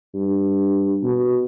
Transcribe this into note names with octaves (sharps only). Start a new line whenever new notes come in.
G2
B2